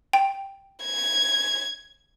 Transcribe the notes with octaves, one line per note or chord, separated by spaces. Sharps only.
G5
G#6